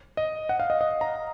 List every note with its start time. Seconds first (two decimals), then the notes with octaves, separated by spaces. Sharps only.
0.17 D#5
0.49 F#5
0.60 F5
0.70 D#5
0.81 D#5
1.01 A#5